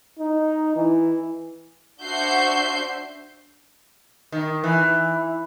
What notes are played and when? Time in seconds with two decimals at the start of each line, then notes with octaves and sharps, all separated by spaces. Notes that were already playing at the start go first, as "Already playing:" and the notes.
0.19 D#4
0.76 E3
2.01 D4 F#4 C5 E5 G6 C7
4.32 D#3
4.64 E3